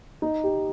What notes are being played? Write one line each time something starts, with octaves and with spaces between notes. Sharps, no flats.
D#4
G4